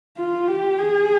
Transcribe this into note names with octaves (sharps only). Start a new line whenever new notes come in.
F4
G4
G#4